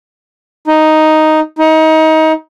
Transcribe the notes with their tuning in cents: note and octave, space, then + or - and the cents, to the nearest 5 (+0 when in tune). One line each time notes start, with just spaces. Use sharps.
D#4 +0
D#4 +25